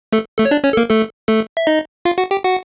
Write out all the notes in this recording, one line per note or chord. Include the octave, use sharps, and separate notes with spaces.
A3 A4
A3 A4
C#5
D4 D5
C#4 C#5
A4
A#3 A#4
A3 A4
A3 A4
E5
D#4 D#5
F4 F5
F#4 F#5
G4 G5
F#4 F#5